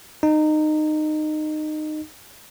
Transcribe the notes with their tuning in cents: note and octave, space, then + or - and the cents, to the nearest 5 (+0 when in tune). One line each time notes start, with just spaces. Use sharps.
D#4 -20